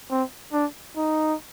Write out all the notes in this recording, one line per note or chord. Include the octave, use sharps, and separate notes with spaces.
C4
D4
D#4